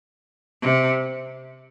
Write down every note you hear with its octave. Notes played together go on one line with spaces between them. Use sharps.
C3